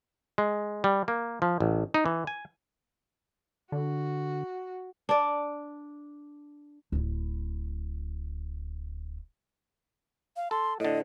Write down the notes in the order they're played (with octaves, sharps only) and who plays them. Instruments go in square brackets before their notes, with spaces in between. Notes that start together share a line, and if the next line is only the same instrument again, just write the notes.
[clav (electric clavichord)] G#3
G3
A#3
F3
A1
D#4
E3
G#5
[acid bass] D3 [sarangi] F#4
[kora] D4 D5
[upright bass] D1 E4
[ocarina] F5
[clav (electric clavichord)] A4 [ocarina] C6
[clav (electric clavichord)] A2 D3 [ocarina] D#5